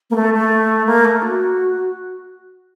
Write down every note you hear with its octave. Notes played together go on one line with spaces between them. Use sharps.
A#3
A3
A3
A#3
A3
F#4